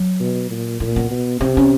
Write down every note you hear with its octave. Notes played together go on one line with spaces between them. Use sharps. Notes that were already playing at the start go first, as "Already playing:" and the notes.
Already playing: F#3
B2
A#2
A#2 A#3
B3
B2
C3 C4
C#4